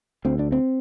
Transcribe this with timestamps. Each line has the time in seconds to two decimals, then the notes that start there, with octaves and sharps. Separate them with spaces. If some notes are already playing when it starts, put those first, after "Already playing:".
0.25 D2 C4
0.39 D4
0.52 C4